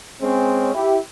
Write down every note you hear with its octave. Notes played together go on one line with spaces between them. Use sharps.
G#3 C4 C#4
E4 G4